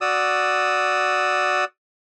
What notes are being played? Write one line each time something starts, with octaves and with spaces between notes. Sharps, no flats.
F#4 D5 D#6 E6